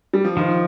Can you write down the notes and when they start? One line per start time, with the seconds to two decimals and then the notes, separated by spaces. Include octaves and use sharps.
0.13 G3
0.25 F3
0.37 D#3 F3